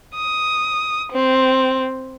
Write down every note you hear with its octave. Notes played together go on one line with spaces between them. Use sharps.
D#6
C4